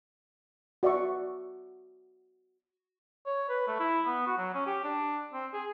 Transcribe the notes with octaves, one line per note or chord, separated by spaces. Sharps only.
F#4 D5 E5 C#6
C#5
B4
A3
E4
B3
F#4
F#3
C#4
G4
D4
C4
G#4